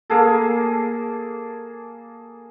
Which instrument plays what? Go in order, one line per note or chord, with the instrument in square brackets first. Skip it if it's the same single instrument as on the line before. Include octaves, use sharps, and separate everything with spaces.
[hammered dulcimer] A#3 G#4 A4